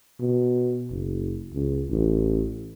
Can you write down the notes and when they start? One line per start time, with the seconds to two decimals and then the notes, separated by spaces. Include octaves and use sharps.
0.20 B2
0.89 F#1
1.53 C#2
1.89 A1